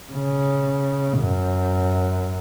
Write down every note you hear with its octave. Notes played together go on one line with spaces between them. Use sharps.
C#3
F#2